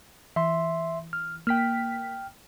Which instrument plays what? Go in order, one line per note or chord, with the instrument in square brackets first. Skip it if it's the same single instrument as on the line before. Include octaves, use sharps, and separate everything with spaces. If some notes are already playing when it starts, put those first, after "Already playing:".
[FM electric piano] E3 [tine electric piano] E5 C6
[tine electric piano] F6
[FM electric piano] A#3 B6 [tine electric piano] G5 F6